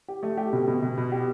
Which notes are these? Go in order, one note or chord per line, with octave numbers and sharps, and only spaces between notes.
G4
A3
G4
B2
B2
B2
B2
G4